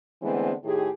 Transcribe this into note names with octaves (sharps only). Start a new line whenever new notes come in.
D3 E3 G#3 A3 B3 C4
A2 D#3 G4 G#4